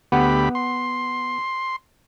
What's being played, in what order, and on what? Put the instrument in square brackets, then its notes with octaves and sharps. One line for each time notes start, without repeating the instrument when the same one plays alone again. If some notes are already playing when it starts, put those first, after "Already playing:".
[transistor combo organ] D2 G4 B5 [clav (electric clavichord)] B3 F#5
[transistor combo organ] C6